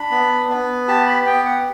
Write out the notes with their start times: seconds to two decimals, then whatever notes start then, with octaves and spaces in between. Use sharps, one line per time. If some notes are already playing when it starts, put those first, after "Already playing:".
Already playing: D4 B5
0.11 B3
0.49 B3
0.88 G4 A5
1.07 B5
1.26 B3 G5
1.45 F#5